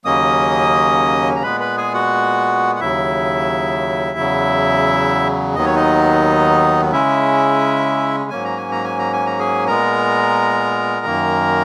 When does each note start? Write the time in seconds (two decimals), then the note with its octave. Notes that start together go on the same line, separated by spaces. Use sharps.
0.05 D#2 C#3 F#3 A#3 C#4 D#5 D#6
1.36 A#5
1.42 A#2 G#3 B3 B4 B5
1.61 B4 B5
1.77 G#4 G#5
1.94 F#4 F#5
2.76 F#5
2.80 D#2 C#3 F#3 E4 E5
4.18 E2 C#3 F#3
5.55 D#2 D#3 F#3 B3 D#5
5.65 C#5
5.76 D#4 D#5
6.92 C#3 G#3 C#4 E4 E5
8.30 G#2 F#3 A#3 C#4 G#5
8.44 A#5
8.57 G#5
8.71 A#5
8.84 G#5
8.99 A#5
9.13 G#5
9.26 A#5
9.39 G#4 G#5
9.68 A#2 G#3 B3 A#4 A#5
11.06 F#2 D#3 A#3